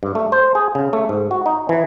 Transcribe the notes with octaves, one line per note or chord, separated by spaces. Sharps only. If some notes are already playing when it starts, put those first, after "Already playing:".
G2
A3
C5
G#4
C#3
A3
G#2
F#4
D#4
E3